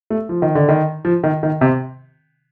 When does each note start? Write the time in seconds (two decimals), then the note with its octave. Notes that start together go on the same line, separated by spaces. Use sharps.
0.10 A3
0.29 F3
0.42 D#3
0.55 D3
0.69 D#3
1.05 F3
1.24 D#3
1.43 D#3
1.61 C3